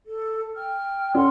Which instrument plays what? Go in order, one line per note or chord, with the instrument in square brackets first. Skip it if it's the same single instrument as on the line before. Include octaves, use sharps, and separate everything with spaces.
[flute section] A4
G5 F6
[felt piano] C#4 [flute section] A4 F#5 C6